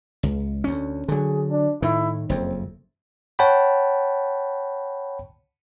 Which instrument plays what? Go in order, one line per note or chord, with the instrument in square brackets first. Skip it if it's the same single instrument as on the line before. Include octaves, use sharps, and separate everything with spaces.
[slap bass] C#2
D2 C#4
[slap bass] D3 F#3 [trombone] G#4
[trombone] D4
[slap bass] A2 D#3 [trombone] E4
[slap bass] F#1 F2 [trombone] C4
[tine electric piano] C#5 F#5 G5 A5 B5